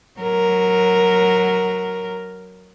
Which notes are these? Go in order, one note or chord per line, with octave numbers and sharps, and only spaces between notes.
F#3 A#4